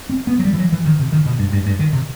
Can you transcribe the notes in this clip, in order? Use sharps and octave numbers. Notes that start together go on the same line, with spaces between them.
C4
B3
F#3
G3
E3
F#3
E3
D#3
C3
D#3
B2
G2
G2
G2
D#3
C3